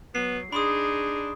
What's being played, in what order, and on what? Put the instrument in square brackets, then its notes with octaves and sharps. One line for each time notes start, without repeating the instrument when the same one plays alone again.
[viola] F#3 [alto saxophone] B3 [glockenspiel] C7
[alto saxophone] D4 [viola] D#4 G#4 [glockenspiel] B5 C6 D#6